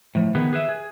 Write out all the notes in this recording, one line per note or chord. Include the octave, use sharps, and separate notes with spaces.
A2 F3
D#3 B3 G#4 B4
G#4 B4 E5
G#4